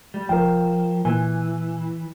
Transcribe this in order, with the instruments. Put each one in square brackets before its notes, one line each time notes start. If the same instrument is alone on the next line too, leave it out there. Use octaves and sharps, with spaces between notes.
[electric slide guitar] G3
[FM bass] F1 [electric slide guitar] F3 [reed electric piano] A#4 G5
[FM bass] A#2 [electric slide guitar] E3 [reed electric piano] G#5